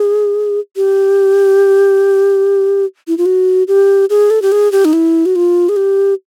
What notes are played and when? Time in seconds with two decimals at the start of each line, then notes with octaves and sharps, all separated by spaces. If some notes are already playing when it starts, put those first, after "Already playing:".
Already playing: G#4
0.76 G4
3.08 E4
3.18 F4
3.26 F#4
3.68 G4
4.10 G#4
4.30 A4
4.42 G4
4.52 G#4
4.72 G4
4.85 D#4
4.93 E4
5.26 F#4
5.36 F4
5.69 G#4
5.76 G4